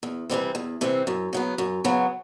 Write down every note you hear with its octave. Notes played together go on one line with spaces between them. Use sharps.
E2
C3 E3 G3 C4
E2
C3 E3 G3 C4
F#2
C#3 F#3 B3
F#2
C#3 F#3 B3